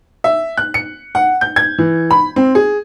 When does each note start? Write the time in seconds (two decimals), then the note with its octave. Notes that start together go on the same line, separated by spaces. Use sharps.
0.24 E5
0.57 F#6
0.74 C#7
1.15 F#5
1.41 G6
1.56 G#6
1.78 E3
2.11 B5
2.36 C4
2.55 G#4